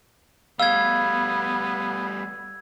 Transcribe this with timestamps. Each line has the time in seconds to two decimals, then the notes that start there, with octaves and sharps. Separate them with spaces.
0.59 G3 A3 B3 F5 E6 G#6